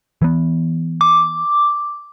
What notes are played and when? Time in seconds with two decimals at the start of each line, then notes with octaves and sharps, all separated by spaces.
0.22 E3 B3
1.01 D6